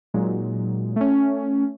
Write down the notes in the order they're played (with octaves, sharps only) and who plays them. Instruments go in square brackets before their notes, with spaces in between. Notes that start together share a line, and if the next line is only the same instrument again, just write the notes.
[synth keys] A#2 F#3 G#3 D#4
A3 C#4